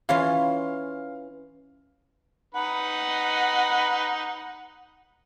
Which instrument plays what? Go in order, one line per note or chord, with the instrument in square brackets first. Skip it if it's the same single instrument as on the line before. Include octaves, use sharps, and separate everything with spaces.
[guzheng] E3 C#4 F4 [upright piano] F5
[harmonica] D#4 B4 [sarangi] F#5